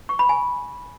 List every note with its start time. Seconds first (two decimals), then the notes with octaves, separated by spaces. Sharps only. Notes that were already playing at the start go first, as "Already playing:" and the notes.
0.09 C#6
0.19 B5
0.29 G#5